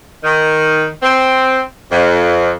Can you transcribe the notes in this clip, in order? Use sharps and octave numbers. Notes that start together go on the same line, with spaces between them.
D#3
C4
F2